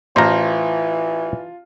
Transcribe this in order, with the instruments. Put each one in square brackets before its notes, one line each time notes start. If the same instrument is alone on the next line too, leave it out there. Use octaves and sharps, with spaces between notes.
[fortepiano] A1 [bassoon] E3 [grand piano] F4 A5 F6 [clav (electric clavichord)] C5 A#5